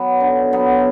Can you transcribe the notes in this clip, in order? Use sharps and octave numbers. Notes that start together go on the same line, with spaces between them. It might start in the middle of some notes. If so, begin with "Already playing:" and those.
Already playing: F#3 B3
D3
F#3 B3